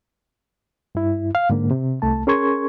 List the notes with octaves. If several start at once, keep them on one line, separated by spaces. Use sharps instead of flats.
G2 E4
F5
G#2 D3 A#3
C3
C2 A3 A5
C#4 G#4 A#4 C6 C#6 G#6